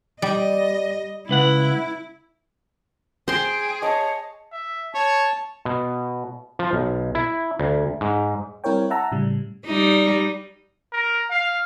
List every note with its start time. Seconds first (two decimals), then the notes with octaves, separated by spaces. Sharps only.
0.22 G3 D#5
1.29 C#2 E4 B4 F#5
3.28 G#4 C5 G5 C6
3.82 C#5 D#5 A5
4.52 E5
4.95 C#5 A5
5.65 B2
6.59 F3
6.73 B1
7.15 E4
7.59 D2
8.01 G#2
8.64 G3 C4 E4 A#4 C#5 G5
8.90 E5 F#5 A5 A#5 E6
9.11 A2 C#3 G3
9.66 G3 D#4
10.92 A#4
11.30 F5